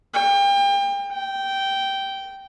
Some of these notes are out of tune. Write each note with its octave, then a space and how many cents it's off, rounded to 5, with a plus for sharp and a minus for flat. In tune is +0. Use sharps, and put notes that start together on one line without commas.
G5 +30
G5 -10